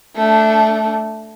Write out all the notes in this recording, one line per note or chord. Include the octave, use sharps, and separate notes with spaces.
A3 D4